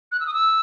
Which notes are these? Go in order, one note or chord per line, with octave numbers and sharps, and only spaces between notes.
F#6
E6
D#6
E6